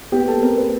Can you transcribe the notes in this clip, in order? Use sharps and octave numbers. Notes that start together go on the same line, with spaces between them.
B3 G4
A4
C4 A#4
B4